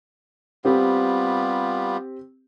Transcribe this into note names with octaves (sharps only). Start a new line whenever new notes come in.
G3 B3 C4 F4 G4